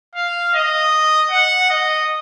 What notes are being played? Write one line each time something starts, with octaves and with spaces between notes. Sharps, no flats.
F5
D#5
F#5
D#5